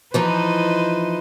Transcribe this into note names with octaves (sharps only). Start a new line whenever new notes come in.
E3 F3 D#4 B4 C5 D#5